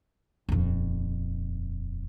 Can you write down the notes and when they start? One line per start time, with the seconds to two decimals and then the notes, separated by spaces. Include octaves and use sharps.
0.49 D#1 F2